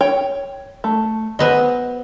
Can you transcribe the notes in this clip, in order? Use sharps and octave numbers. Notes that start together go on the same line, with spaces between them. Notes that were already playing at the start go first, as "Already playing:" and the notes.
C#5 G5
A3
F#3 B3 C5 D#5 G#5